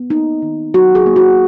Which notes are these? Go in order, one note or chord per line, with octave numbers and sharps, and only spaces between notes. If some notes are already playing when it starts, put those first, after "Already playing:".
Already playing: B3
A#3 D#4
D#3
F#3 F#4
G#4
A#3
F#4